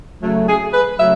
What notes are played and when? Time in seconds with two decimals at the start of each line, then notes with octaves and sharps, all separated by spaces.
0.22 C#3 F#3 A3
0.48 G#4
0.73 B4
0.98 C#3 F#3 A3 E5